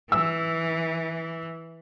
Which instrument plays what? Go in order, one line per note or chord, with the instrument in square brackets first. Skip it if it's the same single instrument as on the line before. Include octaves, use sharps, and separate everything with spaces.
[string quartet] E3 [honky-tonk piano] E6